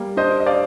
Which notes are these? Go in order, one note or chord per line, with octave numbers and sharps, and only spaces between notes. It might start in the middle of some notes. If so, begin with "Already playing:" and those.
Already playing: G3 A#3
D4 C5 D#5
D#5
D5 F5